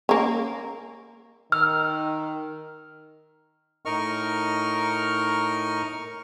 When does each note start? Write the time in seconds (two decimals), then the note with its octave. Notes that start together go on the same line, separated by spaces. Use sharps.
0.09 A#3 C#4
1.52 D#3 E6 F6
3.85 A2 D#4 A#4 D#5 C#6 F6